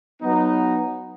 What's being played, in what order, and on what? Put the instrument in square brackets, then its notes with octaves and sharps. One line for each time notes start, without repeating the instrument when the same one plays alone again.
[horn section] F#3 B3 D#4